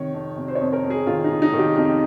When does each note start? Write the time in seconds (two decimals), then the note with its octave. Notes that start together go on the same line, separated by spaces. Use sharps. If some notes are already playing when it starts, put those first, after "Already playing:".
Already playing: C3 D#3 C#5
0.14 F2
0.37 C3
0.48 C5
0.55 C#5
0.61 F2
0.73 A#4
0.84 F2
0.90 G#4
1.07 D#3 F4
1.24 D#4
1.31 C3
1.42 D#4
1.53 D#3
1.59 G4
1.76 F2 D#4